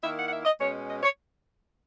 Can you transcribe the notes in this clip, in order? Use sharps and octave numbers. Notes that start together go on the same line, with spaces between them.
D#3 A#3 E4 E5
F#5
F#5
E5
D#5
B2 G#3 C#4 C#5
D#5
C#5